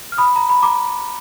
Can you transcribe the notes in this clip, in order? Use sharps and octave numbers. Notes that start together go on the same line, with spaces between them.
F6
B5 D#6
A#5
B5
A#5 D6